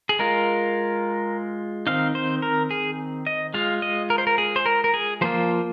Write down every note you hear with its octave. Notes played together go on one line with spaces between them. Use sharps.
G#4
G#3 F4 A#4
D#3 C4 D#4 F5
C5
A#4
G#4
D#5
G#3 F4 F5
D#5
A#4
C5
A#4
G#4
C5
A#4
A#4
G#4
F3 A#3 F4 C5